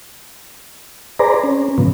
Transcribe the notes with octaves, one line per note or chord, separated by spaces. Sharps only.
G#4 B4 C5 D5 A#5
C#4
A2 C#3 F3 B3